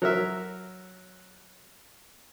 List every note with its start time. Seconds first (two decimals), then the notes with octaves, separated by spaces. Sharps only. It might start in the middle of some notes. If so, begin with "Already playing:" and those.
0.02 F#3 A#4 E5